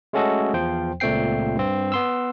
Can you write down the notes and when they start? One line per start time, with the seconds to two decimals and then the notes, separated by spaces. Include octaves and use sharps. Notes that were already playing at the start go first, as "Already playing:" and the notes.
0.13 G#3 A3 C#4 F#4 A4 D#5
0.54 E2 F3 C5 G5
1.00 C#2 A#2 A3 C4 G5 C7
1.56 G2 C4
1.92 B3 C6 E6